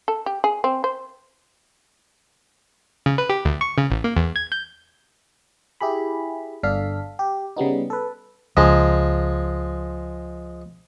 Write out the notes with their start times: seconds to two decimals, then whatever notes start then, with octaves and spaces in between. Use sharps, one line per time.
0.08 A4
0.26 G4
0.44 G#4
0.64 C4
0.84 C5
3.06 C#3
3.18 B4
3.30 G4
3.45 D2
3.61 C#6
3.78 C#3
3.90 A1
4.04 A#3
4.16 E2
4.36 G#6
4.52 G6
5.81 E4 G4 G#4 B5
6.63 G1 D4 A4 F5 B6
7.19 G4
7.57 C#3 G3 B3 D#4
7.90 A4 B4
8.57 C#2 F3 G#3 A#5